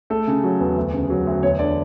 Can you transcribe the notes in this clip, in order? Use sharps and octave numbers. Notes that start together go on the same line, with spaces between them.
A3 A4
C#3
F#3
E2
D2
C#3
F#3
D2
E2 C#5
D3 D5